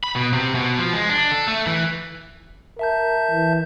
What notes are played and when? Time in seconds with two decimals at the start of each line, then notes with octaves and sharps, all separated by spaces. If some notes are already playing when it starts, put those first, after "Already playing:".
0.04 B5
0.16 B2
0.33 C3
0.55 B2
0.79 F3
0.93 G#3
1.09 D4
1.31 A4
1.48 A3
1.67 E3
2.79 A#4 E5 A5 G6
3.31 E3